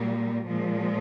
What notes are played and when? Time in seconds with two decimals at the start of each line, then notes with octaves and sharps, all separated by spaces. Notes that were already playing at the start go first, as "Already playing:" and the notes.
Already playing: A#2 G3 A#3
0.47 A#2 F3 G#3